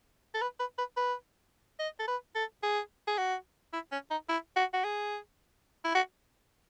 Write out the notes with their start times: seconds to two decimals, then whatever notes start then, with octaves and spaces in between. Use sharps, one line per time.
0.34 A4
0.41 B4
0.60 B4
0.78 B4
0.97 B4
1.79 D#5
1.99 A4
2.08 B4
2.35 A4
2.63 G#4
3.07 G#4
3.18 F#4
3.73 E4
3.92 C#4
4.11 D#4
4.28 E4
4.56 F#4
4.73 F#4
4.84 G#4
5.84 E4
5.95 F#4